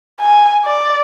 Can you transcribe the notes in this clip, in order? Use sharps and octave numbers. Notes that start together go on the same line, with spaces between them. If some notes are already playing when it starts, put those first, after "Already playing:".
G#5
D5